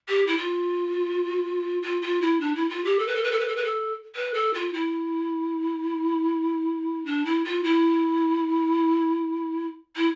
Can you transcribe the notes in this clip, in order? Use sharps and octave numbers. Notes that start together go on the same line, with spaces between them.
G4
E4
F4
F4
F4
E4
D4
E4
F4
G4
A4
B4
A4
B4
A4
B4
A4
B4
A4
B4
A4
F4
E4
D4
E4
F4
E4
E4